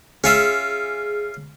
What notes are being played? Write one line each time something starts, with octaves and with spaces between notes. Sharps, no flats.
C#4 F4 G#4 E5